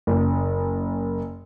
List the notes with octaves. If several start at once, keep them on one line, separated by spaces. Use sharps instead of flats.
F#1